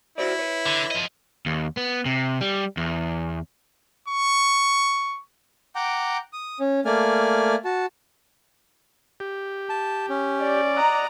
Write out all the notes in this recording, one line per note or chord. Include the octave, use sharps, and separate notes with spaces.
E4 F#4 C5 D5
B4 C#5
D3
F3 D#5
D#2
B3
C3
G3
E2
C#6
F#5 G5 A#5 D6
D#6
C#4
A3 A#3 D5 G#5 F6
F#4 A5
G4
A5
C#4
D5
D#5 F#5 A#5